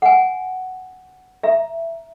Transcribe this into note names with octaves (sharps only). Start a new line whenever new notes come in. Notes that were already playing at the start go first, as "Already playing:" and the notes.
F#5 G#5
E5 A#5